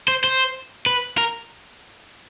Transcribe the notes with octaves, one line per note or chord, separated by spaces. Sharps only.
C5
C5
B4
A#4